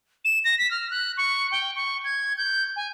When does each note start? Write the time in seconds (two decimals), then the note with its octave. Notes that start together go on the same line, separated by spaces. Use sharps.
0.25 E7
0.45 A#6
0.58 B6
0.71 F6
0.91 F#6
1.17 C#6
1.51 G5
1.76 C#6
2.04 G#6
2.37 G6
2.76 G#5